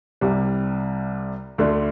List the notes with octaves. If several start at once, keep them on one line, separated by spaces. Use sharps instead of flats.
C2 C3 G3
D2 D3 A3 D4